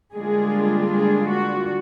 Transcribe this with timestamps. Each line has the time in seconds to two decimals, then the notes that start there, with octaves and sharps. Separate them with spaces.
0.14 D3 G3 G#3 A#3 D4 F4 G#4
0.92 G#3 G#4
1.31 F#4